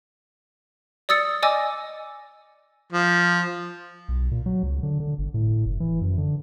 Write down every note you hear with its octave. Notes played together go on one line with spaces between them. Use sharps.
D5 D#6 E6 A6 C#7
D5 D#5 G#5 D6 E6
F3
B1
A#2
F#3
C#2
D3
D3
G1
A2
F#1
E3
F#2
D3